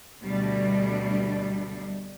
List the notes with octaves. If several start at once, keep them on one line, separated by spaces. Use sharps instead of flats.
D2 B2 G3 A3 D4